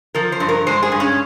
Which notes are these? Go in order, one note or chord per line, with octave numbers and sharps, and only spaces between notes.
F3 A#4
C5
G2
A#4
G#3 C5
G#4
G2
C#4